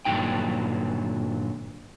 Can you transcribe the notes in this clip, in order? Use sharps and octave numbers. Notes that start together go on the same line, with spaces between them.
G2 A#2 D3 F#3 D#4 G5